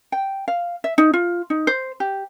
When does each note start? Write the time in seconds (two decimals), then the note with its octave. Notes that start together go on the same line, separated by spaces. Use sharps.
0.12 G5
0.48 F5
0.84 E5
0.98 D#4
1.13 F4
1.50 D#4
1.67 C5
2.00 G4